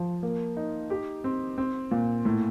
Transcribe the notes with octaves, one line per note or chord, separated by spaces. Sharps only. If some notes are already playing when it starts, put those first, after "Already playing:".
Already playing: F3
A#3
D#4
G4
C4
C4
A#2
A2